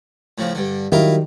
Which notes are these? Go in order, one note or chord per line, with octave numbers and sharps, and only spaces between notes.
A2 C#3 F3
G2 D3
D#3 F#3 G3 E4 F4 A#4